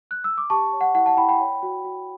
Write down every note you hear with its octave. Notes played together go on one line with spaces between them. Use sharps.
F#6
E6
D6
G4 A5 C#6
C#5
F#5
E4 F#5
F#5 A5
E4 G5 B5
G5 B5
C#5
F#4
F#4